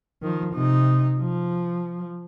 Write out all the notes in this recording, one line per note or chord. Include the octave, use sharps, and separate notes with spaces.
D#3 F3
C3 D#4
F3